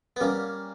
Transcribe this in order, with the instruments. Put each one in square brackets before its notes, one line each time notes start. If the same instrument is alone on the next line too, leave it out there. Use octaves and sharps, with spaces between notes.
[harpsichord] B3
[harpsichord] G3 A#3 [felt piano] C#4